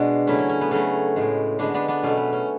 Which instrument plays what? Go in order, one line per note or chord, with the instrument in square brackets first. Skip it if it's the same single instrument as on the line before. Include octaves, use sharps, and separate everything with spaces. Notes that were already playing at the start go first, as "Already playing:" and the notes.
Already playing: [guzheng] B2 G#3 D4 F#4
C#3 F#3 A3 C#4 E4
C#4
C#4
B3
C#3 F#3 A3 C#4
A2 G#3
D3 G#3 B3 D4
B3 D4
B3 D4
B2 F#3 A3 C#4
B3
C#4